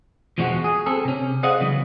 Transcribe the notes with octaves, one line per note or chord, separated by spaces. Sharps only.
E2 B2 F3 G#3 F#4
G#4
C4 G#4 A4
C3 C#4
G#4 C5 D5 D#5 F5 F#5
C#3 E3 F#3 B3